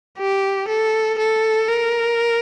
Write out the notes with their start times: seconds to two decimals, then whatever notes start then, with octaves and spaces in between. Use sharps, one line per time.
0.19 G4
0.68 A4
1.19 A4
1.68 A#4